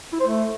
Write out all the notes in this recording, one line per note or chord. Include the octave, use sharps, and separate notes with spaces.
E4
C5
A3